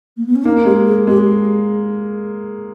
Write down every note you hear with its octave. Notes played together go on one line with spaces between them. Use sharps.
A#3
B3
C#4
A#3 D#4
G#3 G4
G#4
G#3 G4